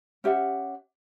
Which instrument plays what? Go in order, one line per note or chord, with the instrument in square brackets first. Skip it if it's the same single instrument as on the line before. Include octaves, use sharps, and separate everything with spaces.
[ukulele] C#4 G4 E5 F#5